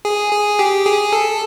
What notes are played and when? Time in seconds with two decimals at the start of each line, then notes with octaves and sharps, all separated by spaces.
0.05 G#4
0.32 G#4
0.59 G4
0.85 G#4
1.13 A4